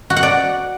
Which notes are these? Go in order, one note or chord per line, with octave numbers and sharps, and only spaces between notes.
F#4
F#5
D5